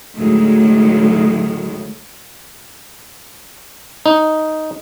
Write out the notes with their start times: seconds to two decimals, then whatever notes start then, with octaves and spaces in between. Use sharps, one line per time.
0.18 D2 A2 D#3 F#3 G#3
4.06 D#4